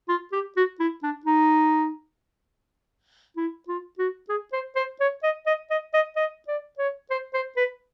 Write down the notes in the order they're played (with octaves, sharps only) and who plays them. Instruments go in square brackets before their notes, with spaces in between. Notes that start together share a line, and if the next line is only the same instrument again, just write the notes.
[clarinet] F4
G4
F#4
E4
D4
D#4
E4
F4
F#4
G#4
C5
C5
C#5
D#5
D#5
D#5
D#5
D#5
D5
C#5
C5
C5
B4